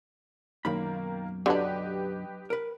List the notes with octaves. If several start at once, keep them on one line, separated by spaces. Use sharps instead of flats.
B1 F#2 D#3 A#3 B5
D3 F#3 D4 G4 B4 D#5
A#4 B4